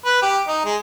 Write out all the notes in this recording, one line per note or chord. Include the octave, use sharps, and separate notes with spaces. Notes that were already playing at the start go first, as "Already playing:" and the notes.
B4
G4
D#4
G#3